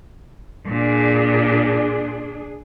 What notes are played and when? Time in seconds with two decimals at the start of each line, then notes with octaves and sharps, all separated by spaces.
0.67 A#2 D4 G#4